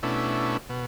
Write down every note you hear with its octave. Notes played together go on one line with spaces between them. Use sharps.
B2 A3 C#4 D4 E4
B2